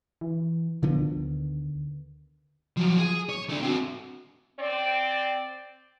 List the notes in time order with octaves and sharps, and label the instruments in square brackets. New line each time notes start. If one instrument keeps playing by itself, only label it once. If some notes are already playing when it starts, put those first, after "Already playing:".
[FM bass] E3
[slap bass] D3 D#3 B3 [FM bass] F3
[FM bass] D2
[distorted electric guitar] F3 F#3
G#4
C#5
A3 D4
C4 F#4
[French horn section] C4 D5